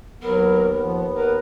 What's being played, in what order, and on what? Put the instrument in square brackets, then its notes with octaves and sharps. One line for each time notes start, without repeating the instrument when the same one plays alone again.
[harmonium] D#2 B3 [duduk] F#3 [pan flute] A#4
[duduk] F3
[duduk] A#4 [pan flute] B4